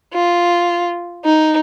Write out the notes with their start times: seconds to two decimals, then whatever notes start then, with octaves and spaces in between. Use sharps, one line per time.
0.14 F4
1.25 D#4